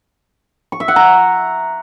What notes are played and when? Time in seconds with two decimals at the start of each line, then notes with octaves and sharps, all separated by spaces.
0.72 C#6
0.80 E5
0.88 F#5
0.96 A#5